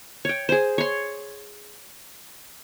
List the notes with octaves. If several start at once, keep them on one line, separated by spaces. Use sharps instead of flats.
C#5 G5
G#4 C5
C#5 C6